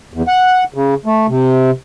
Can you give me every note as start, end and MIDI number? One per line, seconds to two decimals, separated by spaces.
0.14 0.22 40
0.27 0.64 78
0.74 0.94 49
1.06 1.27 57
1.28 1.71 48